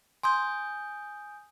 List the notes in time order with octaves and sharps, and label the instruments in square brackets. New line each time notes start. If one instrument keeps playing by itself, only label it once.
[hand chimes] G#5 D#6 G6 [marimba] C6